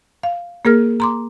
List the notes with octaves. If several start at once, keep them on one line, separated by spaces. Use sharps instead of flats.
F5
A#3 G#4 A#4 F6
A#5 C6 D6